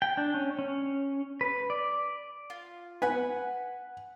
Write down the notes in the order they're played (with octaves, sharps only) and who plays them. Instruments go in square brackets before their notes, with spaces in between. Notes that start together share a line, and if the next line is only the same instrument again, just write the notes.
[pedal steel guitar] G5
D4
C#4
C#4
B4
D5
[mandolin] F4
[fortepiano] B4 G#5 [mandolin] F#5 B5